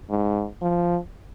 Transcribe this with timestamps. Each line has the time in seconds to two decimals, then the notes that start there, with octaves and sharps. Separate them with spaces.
0.10 G#2
0.62 F3